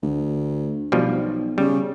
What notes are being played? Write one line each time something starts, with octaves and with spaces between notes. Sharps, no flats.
D2
B1 B2 F3 G3
C#3 G3